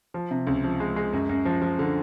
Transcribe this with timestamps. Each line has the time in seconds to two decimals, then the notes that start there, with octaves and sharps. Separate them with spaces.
0.14 F3
0.31 C3
0.47 C#2
0.64 F3
0.80 G#3
0.96 G#3
1.13 F#2
1.29 F#2
1.45 F3
1.62 F3
1.79 D3